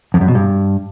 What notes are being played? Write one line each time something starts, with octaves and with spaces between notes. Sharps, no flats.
F2
F#2
B2
G2